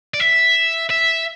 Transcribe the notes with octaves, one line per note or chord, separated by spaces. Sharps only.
D5
E5
E5